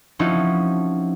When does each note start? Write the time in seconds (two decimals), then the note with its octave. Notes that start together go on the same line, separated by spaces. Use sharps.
0.19 F3 C4 C#4 D#4 E4 F#4